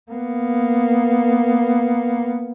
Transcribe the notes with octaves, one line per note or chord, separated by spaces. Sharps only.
A#3 B3